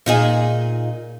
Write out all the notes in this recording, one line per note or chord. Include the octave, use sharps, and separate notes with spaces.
A#2 D#4 G#4